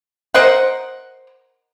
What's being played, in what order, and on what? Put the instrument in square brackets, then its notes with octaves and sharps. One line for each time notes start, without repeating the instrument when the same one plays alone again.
[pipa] A#4 C5 D#5 F#5